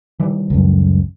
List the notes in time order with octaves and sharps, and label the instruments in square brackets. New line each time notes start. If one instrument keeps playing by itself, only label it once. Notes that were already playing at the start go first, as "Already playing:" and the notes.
[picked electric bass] D#3 E3 G3
[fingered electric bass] C#2 F#2